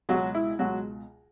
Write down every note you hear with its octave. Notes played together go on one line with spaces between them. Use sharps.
C#2 B2 F#3 G#3 F#4
E4
C#2 B2 F#3 G#3 F#4